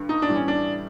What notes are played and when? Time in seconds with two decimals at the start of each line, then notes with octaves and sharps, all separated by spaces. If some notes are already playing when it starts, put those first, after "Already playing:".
Already playing: G2 D3 G3
0.09 D#4
0.22 D4
0.27 A2 E3 G3
0.35 C#4
0.48 D4